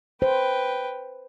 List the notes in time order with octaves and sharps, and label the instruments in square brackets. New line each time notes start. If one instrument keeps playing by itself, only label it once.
[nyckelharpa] B4 G5 [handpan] C5